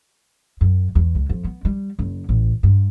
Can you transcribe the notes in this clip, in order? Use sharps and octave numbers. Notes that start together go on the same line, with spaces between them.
F#2
E2
C#2
F2
B3
G3
F#1
A1
G2